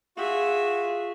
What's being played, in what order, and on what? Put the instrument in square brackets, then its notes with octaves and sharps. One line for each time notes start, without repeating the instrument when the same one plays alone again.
[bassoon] F4 [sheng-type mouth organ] F#4 [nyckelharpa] G#4 E5